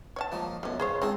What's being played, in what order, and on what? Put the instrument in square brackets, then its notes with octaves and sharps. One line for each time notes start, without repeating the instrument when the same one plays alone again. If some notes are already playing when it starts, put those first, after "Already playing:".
[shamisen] C#5 D#5 A5
[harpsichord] F3 A#3 D#4
[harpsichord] F#2 B2 [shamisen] A3 C#4
[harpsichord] C#3 [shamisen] G#4 C5 C#5
[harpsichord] C#2 G#4 A5 [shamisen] C4 D#4 E5